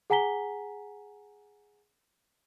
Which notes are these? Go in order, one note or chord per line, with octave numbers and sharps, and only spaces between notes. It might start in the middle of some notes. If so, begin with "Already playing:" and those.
G#4 F#5 G#5 A#5 B6 G7